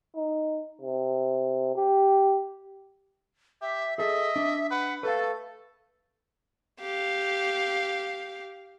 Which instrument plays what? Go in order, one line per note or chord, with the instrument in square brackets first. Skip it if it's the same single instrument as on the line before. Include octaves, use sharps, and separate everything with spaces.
[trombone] D#4
C3
G4
[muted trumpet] G4 [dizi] E5
[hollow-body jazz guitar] G#4 A4 [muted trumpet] D#5 [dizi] E5
[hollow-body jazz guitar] D4
[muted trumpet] B4 [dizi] F#5
[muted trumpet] A3 [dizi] A4 [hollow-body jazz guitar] B4 F5
[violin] G4 F5